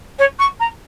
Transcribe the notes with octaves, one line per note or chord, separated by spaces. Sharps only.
C#5
C#6
A#5